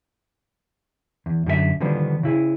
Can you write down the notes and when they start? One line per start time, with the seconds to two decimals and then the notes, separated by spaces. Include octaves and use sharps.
1.26 E2
1.46 F#2 D3 G4 E5
1.80 D3 D#3 F3 G3 B3 D4
2.23 C#3 E4 G#4